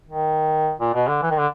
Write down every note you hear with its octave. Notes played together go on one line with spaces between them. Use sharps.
D#3
A#2
B2
D3
E3
D#3
D3